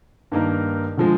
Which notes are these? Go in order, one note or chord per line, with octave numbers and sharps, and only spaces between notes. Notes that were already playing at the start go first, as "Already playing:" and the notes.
G2 D#3 A#3 D#4 A#4
D3 F3 G#3